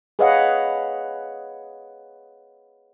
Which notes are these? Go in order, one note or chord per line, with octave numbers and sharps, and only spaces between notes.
G#4 B4 C#5 D#5 F5 F#5